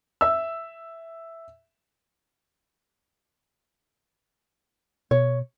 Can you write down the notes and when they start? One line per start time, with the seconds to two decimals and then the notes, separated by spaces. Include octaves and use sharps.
0.21 E5 E6
5.11 B2 C#5